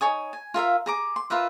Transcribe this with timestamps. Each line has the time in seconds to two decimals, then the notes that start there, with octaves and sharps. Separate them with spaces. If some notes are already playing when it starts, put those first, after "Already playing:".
0.01 D#4 C#5 G#5 D#6
0.33 G#5
0.54 F4 A#4 E5 F5
0.86 G#4 A#5 D6
1.16 C6
1.30 F4 A#4 B4 E5